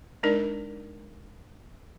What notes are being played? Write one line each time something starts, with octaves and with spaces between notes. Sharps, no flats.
G#3 D4 D#4 A#4 D5